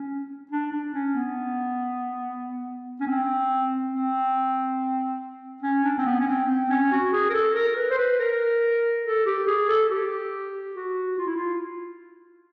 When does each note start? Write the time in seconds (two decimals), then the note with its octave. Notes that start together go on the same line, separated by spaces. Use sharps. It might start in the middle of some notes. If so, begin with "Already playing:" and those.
Already playing: C#4
0.51 D4
0.72 D4
0.94 C#4
1.15 B3
3.00 C#4
3.07 C4
3.93 C4
5.62 C#4
5.84 D4
5.98 C4
6.06 B3
6.20 C#4
6.27 C4
6.49 C4
6.69 C#4
6.91 F#4
7.13 G#4
7.29 A#4
7.33 A4
7.55 A#4
7.76 B4
7.90 C5
7.97 B4
8.19 A#4
9.04 A4
9.25 G4
9.47 G#4
9.68 A4
9.89 G4
10.75 F#4
11.18 F4
11.27 E4
11.36 F4